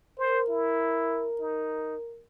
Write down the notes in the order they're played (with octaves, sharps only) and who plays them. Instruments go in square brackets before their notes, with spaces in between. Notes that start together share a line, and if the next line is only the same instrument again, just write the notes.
[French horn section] A#4 [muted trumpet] C5
[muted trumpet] E4
D#4